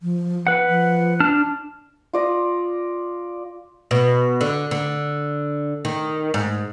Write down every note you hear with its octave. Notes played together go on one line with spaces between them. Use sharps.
F3
B4 F#5
F3
D4 A5 F6
F4 D5 D#5
B2
D3
D3
D#3
G#2